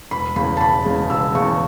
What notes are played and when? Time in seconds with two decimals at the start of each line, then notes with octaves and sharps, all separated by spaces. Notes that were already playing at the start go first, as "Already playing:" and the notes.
0.11 E1 B5
0.36 E2 C#3 G#3 B5
0.57 A5
0.61 E1 B5
0.85 E2 C#3 G#3
1.09 E1 E6
1.35 E2 C#3 G#3 C#6